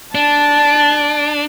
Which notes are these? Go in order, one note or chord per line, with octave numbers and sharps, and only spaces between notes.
D4 A5